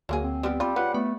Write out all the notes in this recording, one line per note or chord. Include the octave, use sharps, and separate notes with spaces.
D2 F#3 A#3 G#4
C4
G3 B3 G4
G3 F4
C#3 F4 B4 F#5
A3 B3